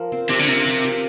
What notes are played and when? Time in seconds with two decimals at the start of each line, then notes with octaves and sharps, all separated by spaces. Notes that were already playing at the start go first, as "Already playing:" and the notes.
Already playing: F3 A#4
0.12 C4
0.30 C3 F3
0.40 D3
0.48 C3 A#4
0.67 F3
0.85 G4